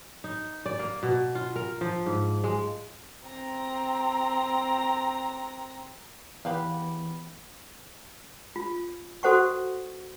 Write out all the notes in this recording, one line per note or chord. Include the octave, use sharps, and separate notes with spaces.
D#4
D5
A#3
B2
F4
A#4
F3
G#2
G#3
C4 A#5
E3 B3 G4 B4 F5
F4
F#4 A4 C5 F#5 C#6